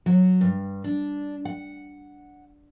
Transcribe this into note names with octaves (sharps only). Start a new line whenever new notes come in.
F#3
G2
D4
F#5